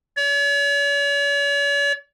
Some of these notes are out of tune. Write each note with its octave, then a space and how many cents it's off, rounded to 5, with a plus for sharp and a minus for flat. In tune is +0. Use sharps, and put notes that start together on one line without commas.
C#5 +45